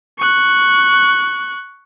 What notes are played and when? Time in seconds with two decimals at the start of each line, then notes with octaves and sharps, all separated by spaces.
0.19 C#6 F#6